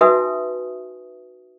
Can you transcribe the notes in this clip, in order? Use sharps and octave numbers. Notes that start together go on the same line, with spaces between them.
D#4 F#4 B4 E5 G#5 D#6